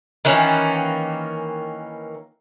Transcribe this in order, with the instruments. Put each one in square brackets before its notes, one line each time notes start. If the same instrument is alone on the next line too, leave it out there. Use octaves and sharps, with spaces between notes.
[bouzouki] D#3 E3 A#3 C#4